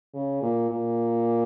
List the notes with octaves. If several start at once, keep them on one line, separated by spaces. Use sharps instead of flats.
C#3
A#2
A#2